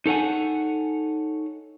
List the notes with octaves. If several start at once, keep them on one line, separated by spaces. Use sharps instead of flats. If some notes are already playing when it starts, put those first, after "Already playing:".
D#4 A4 C#5 F#5 G#5